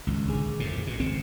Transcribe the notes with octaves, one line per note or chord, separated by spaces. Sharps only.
G#1 C#2
A#1 D3 G#4
F2 A2
B2
G#1 C#3 C4